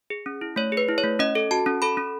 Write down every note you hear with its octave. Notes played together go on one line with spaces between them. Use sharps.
G#4
C#4
E4
A3 C#5
G#4
B4
E4
C#5
A3
C#4 D#5
A4
F#4 A5
C#4
A4 B5
C#4